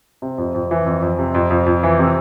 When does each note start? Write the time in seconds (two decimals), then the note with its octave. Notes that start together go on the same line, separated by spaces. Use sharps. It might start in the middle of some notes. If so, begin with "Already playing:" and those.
0.22 C3
0.38 F2
0.54 F2
0.71 E3
0.86 F2
1.02 F2
1.19 C3
1.35 F2
1.50 F2
1.66 F2
1.83 E3
1.99 C3